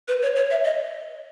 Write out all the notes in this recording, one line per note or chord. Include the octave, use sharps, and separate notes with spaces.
B4
C#5
C#5
E5
D#5